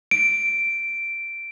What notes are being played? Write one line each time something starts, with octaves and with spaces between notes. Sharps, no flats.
D7